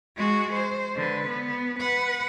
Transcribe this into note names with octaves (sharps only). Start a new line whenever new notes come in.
G#3 F#4
C5
D3 B4
B3
B4 F#5